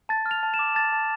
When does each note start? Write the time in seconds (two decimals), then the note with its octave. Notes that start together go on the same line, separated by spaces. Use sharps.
0.09 A5 A6
0.26 F6
0.31 F7
0.43 A5
0.54 E7
0.59 D6
0.75 A5 A6
0.93 A5